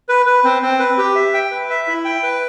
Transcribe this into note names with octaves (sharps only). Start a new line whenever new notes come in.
B4
B4
C4
C4
B4
G4
E5
G5
B4
E5
E4
G5
B4